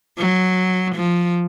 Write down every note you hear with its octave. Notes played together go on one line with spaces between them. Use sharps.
F#3
F3